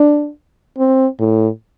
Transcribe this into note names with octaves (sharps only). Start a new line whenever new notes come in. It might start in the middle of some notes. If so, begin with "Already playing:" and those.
Already playing: D4
C4
A2